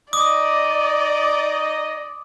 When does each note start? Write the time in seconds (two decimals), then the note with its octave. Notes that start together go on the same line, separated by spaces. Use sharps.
0.13 D#4 D5 D#5 D6 D#6